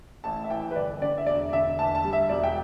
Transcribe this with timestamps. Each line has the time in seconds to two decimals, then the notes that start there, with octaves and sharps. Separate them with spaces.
0.24 A1 A5
0.44 E5
0.50 E3 G5
0.71 B4
0.76 G1 D5
1.01 D3 D5
1.18 E5
1.27 E1 D5
1.52 D3 E5
1.79 E2 A5
1.95 A5
2.04 G3
2.13 E5
2.29 E1 D5
2.43 G5